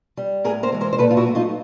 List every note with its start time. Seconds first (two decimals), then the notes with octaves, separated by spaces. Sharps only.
0.17 G3
0.44 A2 G#4 A#4
0.63 A#4 C5
0.72 E3 G#3
0.81 A#4 C5
0.93 C5
0.98 A#2 A4 B4
1.11 F4
1.17 E4 F#4
1.26 F#3 A3
1.35 D#4 F4